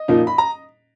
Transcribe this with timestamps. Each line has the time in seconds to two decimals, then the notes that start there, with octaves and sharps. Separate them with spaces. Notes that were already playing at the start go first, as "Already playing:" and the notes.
Already playing: D#5
0.08 A#2 F3 A#3 D#4
0.27 B5
0.38 A#5